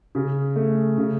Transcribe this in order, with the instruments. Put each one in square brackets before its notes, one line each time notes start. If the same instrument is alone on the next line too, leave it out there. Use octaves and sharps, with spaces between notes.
[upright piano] C#3
A3
C#3